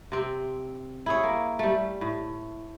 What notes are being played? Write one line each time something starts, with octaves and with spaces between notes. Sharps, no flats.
C3 C4
E4 G#4 C#5
A#3
G3 A3
A2